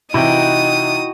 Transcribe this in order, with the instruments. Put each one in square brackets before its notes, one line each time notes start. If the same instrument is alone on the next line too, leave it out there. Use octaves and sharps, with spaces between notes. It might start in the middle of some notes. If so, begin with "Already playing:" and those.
[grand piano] C3 E3 [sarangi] D#4 [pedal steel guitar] E4 F#4 G5 [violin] D#6